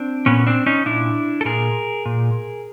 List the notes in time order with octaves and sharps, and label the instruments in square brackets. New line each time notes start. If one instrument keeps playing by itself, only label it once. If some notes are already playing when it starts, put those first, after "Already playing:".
Already playing: [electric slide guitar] C4 D4
A#2 B3 C#4
C4 D4
C#4 D#4
A#2 D4 E4
A4
A#2 G#4 A#4
A#2